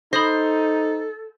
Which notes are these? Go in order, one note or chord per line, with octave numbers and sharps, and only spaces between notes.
D#4 A4 C5 B5 D#6 A#6